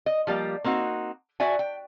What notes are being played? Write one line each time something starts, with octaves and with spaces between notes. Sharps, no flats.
D#5
F3 G3 A#3 G4
A#3 C4 D#4 F#4
F#4 D5 E5 G#5
G5